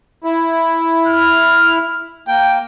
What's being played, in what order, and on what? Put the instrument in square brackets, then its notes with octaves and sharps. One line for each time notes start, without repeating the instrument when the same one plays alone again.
[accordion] E4
[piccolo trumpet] F6
[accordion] A#3 [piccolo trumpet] G5